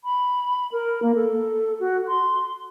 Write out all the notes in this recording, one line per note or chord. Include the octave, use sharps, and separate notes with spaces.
B5
A#4
A#3
A4
F#4
C6